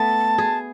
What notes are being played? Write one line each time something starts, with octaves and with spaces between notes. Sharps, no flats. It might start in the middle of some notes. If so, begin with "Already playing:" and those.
Already playing: A3 B3 A5
G#4